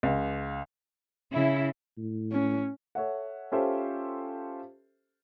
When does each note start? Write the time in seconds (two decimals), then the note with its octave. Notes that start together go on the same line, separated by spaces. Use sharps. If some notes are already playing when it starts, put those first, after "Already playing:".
0.03 C#2
1.34 C#3 E4
1.98 A2
2.33 C#4
2.95 A4 C#5 E5 F#5
3.52 C#4 F4 G4 A4 C5 E5